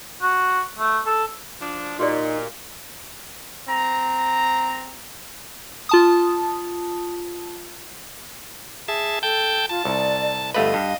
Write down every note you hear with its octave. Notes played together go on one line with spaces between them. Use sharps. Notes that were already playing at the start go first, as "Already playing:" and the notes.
F#4
A3
A4
F3 D4
A#2 D#4 F#4 G4 D5
C4 A#5
F4 A5 D#6
G#4 E5 A5
A4 G5 A5 G6
F4 A5
C2 D5
G1 A3 B4 D#5 F5
G2